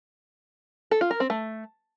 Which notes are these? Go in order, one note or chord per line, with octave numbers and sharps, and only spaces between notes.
A4
F4
A#4
C4
A3